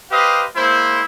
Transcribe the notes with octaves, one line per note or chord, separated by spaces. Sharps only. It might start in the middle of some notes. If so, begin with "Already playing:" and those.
G4 B4 C5 D#5 F5
G#3 A#3 E4 C5